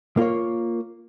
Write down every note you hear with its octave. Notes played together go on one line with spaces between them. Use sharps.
A#3 F4 A#4 C#5